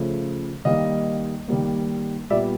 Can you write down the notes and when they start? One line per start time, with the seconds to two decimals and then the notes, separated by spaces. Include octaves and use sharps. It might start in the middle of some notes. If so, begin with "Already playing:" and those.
Already playing: C#3 F3 A3
0.65 D#3 G3 A#3 D#5 F5
1.48 D#3 G3 A#3
2.30 A#2 G3 B3 D5 E5